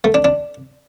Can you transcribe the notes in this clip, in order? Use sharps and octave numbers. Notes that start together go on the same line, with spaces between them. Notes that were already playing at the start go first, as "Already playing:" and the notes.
A3
D4
D4